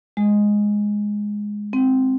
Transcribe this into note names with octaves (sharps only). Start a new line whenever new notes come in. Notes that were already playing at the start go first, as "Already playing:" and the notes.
G#3
C4